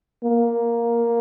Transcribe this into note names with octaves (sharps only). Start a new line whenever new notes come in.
A#3